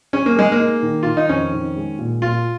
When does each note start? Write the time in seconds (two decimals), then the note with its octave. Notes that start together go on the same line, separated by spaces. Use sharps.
0.13 C#4 G#4
0.26 A#3
0.36 G#3 G#4
0.52 A#3
0.59 D#4
0.83 D#3
1.03 D#3 F4
1.17 D#4
1.29 F2 C#4
1.53 D#3
1.76 G#3
1.99 A#2
2.22 A#2 F4